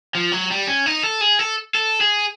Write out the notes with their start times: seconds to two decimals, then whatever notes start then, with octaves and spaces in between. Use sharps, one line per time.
0.15 F3
0.32 F#3
0.50 G3
0.67 C#4
0.86 D#4
1.04 A4
1.21 G#4
1.39 A4
1.75 A4
2.01 G#4